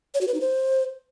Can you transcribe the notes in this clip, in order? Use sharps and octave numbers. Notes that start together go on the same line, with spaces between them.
C#5
F#4
B4
D#4
C5